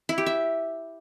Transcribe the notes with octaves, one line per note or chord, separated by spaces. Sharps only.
E4
G4
E5